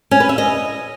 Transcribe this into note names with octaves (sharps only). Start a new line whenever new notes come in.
C#4
B4
E5
D#5